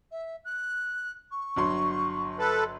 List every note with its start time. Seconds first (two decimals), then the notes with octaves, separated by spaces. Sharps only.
0.11 E5
0.44 F#6
1.31 C#6
1.56 G1 F#3 C6
2.39 A4 B4